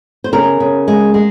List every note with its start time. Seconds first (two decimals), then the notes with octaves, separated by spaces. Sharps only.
0.24 C5
0.32 C#3 A#4
0.60 C#3
0.88 G#3
1.14 G#3